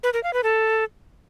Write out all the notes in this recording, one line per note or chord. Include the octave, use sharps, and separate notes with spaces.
B4
A#4
F5
B4
A4